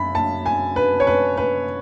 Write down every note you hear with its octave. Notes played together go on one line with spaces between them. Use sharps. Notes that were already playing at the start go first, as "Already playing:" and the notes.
Already playing: F#2 B5
A5
G#5
B4
C#5
B4
B4